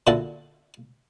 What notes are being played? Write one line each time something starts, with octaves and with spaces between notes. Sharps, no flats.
A#2 D3 E4 F#4 A4